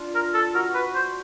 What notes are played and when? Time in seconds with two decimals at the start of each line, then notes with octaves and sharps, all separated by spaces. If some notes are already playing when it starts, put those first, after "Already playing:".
Already playing: D4 F4
0.15 A#4
0.34 A4
0.55 F#4 A#4
0.74 B4
0.95 C5